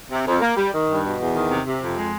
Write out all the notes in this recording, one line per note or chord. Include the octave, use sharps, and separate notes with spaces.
C3
F2
A#3
G3
D#3
G2
B2
E2
D#3
C3
C3
F2
G#3